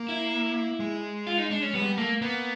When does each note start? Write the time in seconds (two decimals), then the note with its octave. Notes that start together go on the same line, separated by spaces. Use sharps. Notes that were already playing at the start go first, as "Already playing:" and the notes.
Already playing: A#3
0.09 E4
0.80 G#3
1.27 F4
1.38 D#4
1.51 D4
1.62 C#4
1.74 G3 B3
1.81 G#3
1.86 G3
1.97 A3 A#3
2.22 A#3 B3